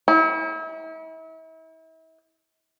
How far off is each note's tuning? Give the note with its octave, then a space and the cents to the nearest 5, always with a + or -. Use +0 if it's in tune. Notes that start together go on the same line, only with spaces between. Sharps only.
E4 -40